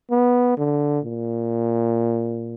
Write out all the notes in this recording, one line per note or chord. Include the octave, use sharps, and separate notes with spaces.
B3
D3
A#2